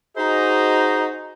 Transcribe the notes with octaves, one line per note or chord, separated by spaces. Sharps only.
D#4 F#4 G#4 C5 D#5 A#5